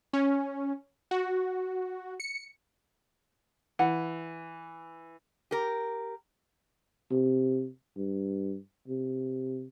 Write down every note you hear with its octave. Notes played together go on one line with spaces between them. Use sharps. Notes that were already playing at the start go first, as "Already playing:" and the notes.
C#4
F#4
C#7
E3 F#5
G4 A#4
C3
G2
C3